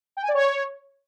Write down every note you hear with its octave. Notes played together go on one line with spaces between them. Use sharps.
G5
G#5
D5
C#5